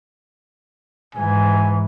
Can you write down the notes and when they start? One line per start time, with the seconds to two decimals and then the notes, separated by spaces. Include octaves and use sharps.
1.15 G#2 E3 G#5